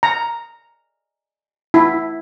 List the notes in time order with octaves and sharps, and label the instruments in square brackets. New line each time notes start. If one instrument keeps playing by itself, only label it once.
[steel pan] A#5
E4